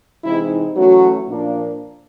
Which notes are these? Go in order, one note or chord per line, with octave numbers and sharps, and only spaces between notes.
C3 E3 G#3 C4 D#4 E4
E3 F#3 A3 C#4 F#4
A#2 F3 A#3 D4